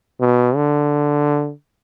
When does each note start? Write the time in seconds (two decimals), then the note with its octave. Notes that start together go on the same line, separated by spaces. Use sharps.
0.21 B2
0.55 D3